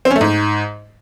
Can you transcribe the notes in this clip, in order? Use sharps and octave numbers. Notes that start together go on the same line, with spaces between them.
C4
C#4
A3
G#2